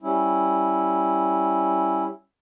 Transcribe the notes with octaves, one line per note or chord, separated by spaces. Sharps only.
G3 C#4 E4